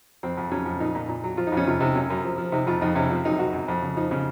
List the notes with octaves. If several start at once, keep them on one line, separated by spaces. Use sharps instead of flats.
F2 C4
F2
F#3 C#4
F2
A#2 D#4
A#2
A#2
F#3
F3 F4
D#4
F2 C#4
C3 F4
C3 D#4
F#2 C#4
F#2
F3
F3
C3 D#4
F2 F4
F2 D#4
C3 C#4
F3 C4
F#2 D#4
F#2 F#4
F#2
F2
C#3
F3 D#4
C#3